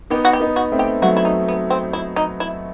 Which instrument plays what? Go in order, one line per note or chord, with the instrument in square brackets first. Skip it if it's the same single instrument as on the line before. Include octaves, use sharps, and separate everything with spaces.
[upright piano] B3 D#4 [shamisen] G4
[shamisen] F#4
G4
[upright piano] B3 D#4
[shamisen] F#4
[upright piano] A3 C4
[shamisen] G4
[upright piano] F#3 A3 [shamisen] F#4
[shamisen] E4
D#4
B3
C4
E4
D#4
E4